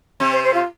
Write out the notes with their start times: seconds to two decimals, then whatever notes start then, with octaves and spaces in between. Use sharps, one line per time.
0.20 C3 C4
0.32 C5
0.43 C5
0.54 F4